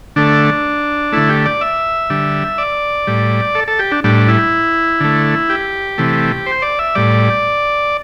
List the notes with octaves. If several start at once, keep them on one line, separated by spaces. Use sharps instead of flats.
D3 A3 D4
D3 A3 E4
G4
D5
E5
D3 G3
D5
A2 G3
A4
A4
G4
D4
A2 G3 D4
E4
D3 A3
G4
C3 E3 A3
C5
D5
E5
A2 G3 D5